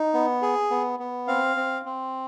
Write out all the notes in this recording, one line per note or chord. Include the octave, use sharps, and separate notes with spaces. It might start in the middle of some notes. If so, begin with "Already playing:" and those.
Already playing: D#4
B3
G#4
B3
B3
C4 F5
C4
C4